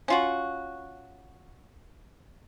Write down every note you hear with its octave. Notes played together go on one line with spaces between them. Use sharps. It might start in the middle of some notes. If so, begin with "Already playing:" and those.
C#4 F4 F#4